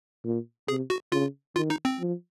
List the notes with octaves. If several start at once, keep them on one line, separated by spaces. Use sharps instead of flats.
A#2
C3 G#4
F#4
C#3 F4
D#3 F4
D#4
C4
F3